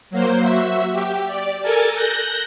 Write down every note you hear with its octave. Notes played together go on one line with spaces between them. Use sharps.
F#3 A#3 C5
F#4 E5
G4
D5
A4 A#4 G#5 A5
F#6 G6 A#6